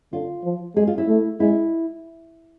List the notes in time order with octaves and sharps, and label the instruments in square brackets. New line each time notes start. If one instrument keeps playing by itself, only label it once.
[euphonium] D3 [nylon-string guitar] F4
[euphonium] F3
[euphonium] G#3 [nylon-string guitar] G#4
[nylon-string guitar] F4
E4
[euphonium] A3
[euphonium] G#3 [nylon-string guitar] E4